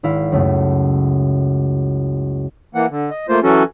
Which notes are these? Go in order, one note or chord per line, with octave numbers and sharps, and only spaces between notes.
G#1 E4 F5
C#2 F#2 C#3 A3
E3 A#3 F#5
D3
D#5
A3 A#3 F4 C5
E3 F#3 C#4 F#4 A4